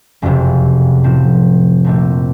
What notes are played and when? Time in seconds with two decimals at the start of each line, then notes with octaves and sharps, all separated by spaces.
0.22 F#1 F2 C3
1.04 A2 F3 C4
1.84 A#1 A#2 A3 C4